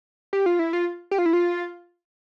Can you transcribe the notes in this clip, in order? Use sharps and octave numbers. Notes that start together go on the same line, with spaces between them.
G4
F4
E4
F4
G4
F4
E4
F4